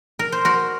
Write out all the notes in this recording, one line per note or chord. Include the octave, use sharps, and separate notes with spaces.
A#4
C5
F#4 A#4